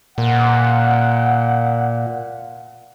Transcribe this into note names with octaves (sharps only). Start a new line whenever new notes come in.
A#2 F#5